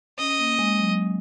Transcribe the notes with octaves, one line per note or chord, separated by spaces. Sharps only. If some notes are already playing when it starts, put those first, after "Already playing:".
C#4 D#5
A#3
G#3
F#3